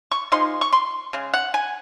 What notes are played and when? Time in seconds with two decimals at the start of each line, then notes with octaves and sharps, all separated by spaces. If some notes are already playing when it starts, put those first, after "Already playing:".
0.11 C#6
0.32 F3 G#3 D#4 C6
0.61 C#6
0.73 C6
1.13 C#3 G#3
1.34 F#5
1.54 G#5